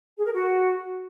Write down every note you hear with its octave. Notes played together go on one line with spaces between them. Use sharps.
G#4
A#4
F#4